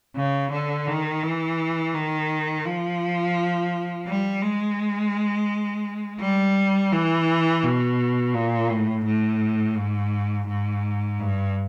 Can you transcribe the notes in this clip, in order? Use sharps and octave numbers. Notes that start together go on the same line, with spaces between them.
C#3
D3
D#3
E3
D#3
F3
G3
G#3
G3
E3
B2
A#2
A2
A2
G#2
G#2
G2